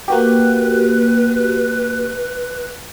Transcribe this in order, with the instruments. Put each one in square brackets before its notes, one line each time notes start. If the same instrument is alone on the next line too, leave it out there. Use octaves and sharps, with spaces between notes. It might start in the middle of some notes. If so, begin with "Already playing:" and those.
[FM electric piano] A#3 F#4 G4 [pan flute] B4